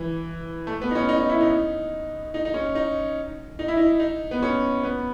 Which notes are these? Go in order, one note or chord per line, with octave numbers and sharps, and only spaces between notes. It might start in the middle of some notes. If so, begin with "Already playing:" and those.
Already playing: E3
A3
B3
D#4
C#4
D#4
D#4
E4
D#4
D#4
D#4
C#4
D#4
D#4
E4
D#4
D#4
B3
C#4
B3